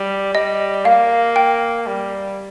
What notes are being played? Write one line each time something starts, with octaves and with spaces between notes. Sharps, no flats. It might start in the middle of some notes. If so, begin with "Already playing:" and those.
Already playing: G3
G3 D#5
A#3 F5
G5
G3